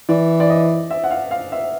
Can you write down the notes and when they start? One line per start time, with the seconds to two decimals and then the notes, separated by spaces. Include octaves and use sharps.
0.09 E3 D5
0.40 D5
0.50 D#5
0.90 E5
1.04 F#5
1.11 F5
1.31 F5
1.52 E5